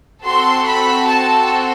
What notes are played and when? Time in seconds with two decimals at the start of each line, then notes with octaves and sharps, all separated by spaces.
0.25 C4 F#4 A4 C6
0.67 B5
1.09 A5